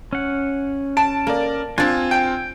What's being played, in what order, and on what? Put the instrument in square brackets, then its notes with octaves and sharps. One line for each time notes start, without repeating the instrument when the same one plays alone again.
[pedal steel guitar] C#4 F#5
[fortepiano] A5 [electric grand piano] D7
[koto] A#3 [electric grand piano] A#4 D5
[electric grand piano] C4 F4 [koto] D4 D5 [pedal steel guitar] G#5
[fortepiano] G5